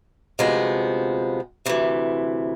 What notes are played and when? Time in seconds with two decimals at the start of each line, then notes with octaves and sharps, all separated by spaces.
0.39 D2 C3 F3 G#3 B3
1.66 D2 C3 E3